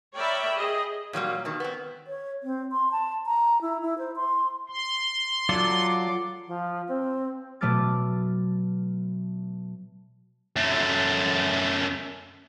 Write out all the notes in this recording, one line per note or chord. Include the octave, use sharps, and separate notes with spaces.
A#4 C#5 D5 E5 G5 B5
G#4 D#5
A#2 F#3 G3 A#3
B2 D#3
B3 C4
C#5
C4
C6
A5
A#5
E4
E4
C5
C6
C6
F#3 F4 A4 D5 D6
F3
C4
B2 F#3 A3 D6 F6 A6
F#2 A3